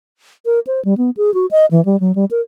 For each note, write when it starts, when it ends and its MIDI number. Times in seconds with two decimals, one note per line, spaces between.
0.45 0.60 70
0.67 0.83 72
0.85 0.94 55
0.98 1.10 59
1.17 1.33 68
1.34 1.46 66
1.51 1.66 75
1.71 1.84 52
1.85 1.99 55
2.00 2.14 54
2.15 2.25 55
2.31 2.41 70